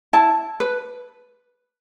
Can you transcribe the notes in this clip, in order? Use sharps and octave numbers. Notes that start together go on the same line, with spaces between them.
E4 A5
B4